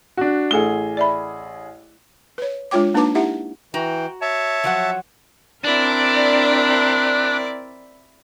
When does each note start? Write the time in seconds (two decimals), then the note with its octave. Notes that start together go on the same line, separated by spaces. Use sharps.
0.17 D4 F#4
0.51 A1 A3 G#4 A4 F#5 G7
0.97 D5 E5 B5
2.38 B4 C#5
2.71 G#3 D4 F4 C#5 G5 D6
2.94 A#3 D4 D#4 B4 A5 D6
3.15 D#4 E4 G4 E5 F#5
3.74 E3 F#4 G5 A#5
4.22 C#5 E5 A5
4.64 F3 F#3 F#5
5.64 C4 D4 E4 A#4 D5